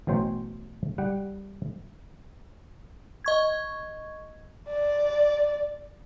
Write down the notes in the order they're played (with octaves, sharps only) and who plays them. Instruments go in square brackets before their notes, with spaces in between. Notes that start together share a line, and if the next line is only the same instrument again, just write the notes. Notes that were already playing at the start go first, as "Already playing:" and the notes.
[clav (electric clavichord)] A1 B2 F#3 C5 G5
G3 F#5 G5
[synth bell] D#5 C#6 G#6
[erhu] D5